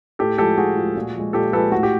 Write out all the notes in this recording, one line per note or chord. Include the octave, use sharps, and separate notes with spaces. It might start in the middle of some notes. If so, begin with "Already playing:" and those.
A2 G4 A4
F3 G#3 G4 A4
A2 F#4 G#4
F3 G#3
A#2
F3 G#3
A#2 G4 A4
F3 G#3 A4 B4
A2 F#4
G4